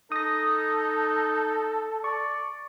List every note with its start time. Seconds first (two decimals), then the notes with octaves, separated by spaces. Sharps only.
0.12 D#4 A4 D#6 A#6
2.04 D5 C#6